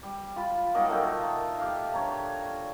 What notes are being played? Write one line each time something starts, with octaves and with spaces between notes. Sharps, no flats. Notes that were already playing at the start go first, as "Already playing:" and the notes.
G3
F4 B5
F#3 G3 A#3 D#4
A#2 A3 D#4 G5
G4 F5
D3 C#5 A#5